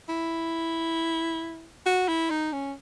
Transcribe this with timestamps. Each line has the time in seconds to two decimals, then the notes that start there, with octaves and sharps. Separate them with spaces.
0.09 E4
1.86 F#4
2.08 E4
2.30 D#4
2.53 C#4